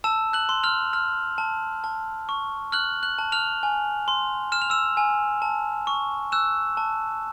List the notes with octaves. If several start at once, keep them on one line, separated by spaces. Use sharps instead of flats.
A5 E6 E7
F#6 F#7
C6
F6 F7
F6
A5
A5
C#6
F6 F#6 F#7
F#6 F#7
A5
F6 F7
G#5
C6
F6 E7
F7
E6 E7
G#5
A5
C#6
E6 F#6 E7
A5